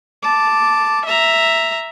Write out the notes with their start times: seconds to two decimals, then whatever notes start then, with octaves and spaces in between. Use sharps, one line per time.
0.22 A5 D6
1.05 E5 A#5